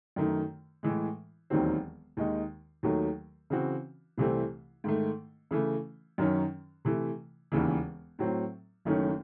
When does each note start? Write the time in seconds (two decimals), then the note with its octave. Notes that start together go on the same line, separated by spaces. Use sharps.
0.16 F#2 D#3 A3
0.83 A2 E3 G#3
1.50 E1 D#2 D#3 F#3 C4
2.17 D#2 D#3 G#3 D#4
2.83 D#2 D#3 F#3 A3
3.50 C#3 E3 C4 F#4
4.18 C2 C3 E3 A3 C4
4.84 G#2 D#3 A3
5.51 C#3 E3 A3
6.18 F#2 D#3 F#3 C#4
6.85 C3 E3 A3
7.52 E1 D#2 C#3 E3
8.19 A2 F#3 C4
8.85 F#1 F#2 D#3 A3 C#4